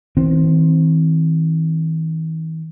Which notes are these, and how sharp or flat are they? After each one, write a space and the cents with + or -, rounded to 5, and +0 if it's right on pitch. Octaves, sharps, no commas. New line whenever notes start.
E3 -45 C4 +0